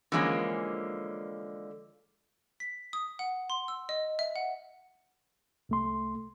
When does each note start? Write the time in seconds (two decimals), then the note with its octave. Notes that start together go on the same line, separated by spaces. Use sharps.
0.12 D3 E3 F3 G#3 A#3 C#4
2.60 B6
2.93 D#6
3.19 F#5
3.50 C6
3.68 E6
3.89 D#5
4.19 E5
4.36 F#5
5.69 C2 A3 C6